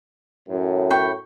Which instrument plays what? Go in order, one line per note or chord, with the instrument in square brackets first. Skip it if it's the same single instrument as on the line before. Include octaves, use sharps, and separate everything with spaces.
[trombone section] F#2 A2
[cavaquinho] B4 G5 C#6